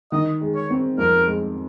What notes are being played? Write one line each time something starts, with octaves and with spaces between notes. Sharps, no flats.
D#3 D#5
G#3
C#5
C4
F2 A#4
G#3